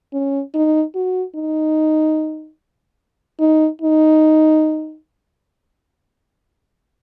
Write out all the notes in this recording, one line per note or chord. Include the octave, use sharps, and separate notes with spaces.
C#4
D#4
F#4
D#4
D#4
D#4